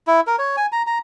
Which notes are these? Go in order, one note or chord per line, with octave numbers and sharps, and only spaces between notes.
E4
A#4
C#5
G#5
A#5
A#5